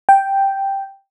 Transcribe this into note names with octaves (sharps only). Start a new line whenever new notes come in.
G5